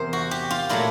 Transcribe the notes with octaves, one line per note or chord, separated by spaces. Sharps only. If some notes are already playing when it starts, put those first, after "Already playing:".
Already playing: E2 C3 A#4 C5
F#4
G4
F4
A#2 F#3 A3 E4